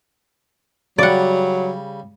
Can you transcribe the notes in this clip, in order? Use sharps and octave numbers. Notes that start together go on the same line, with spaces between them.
C#3 F#3 G3 D5 F#5